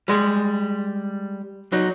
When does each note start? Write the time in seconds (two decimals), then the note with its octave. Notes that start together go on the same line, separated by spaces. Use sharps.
0.08 G3 G#3
1.72 F#3 D#4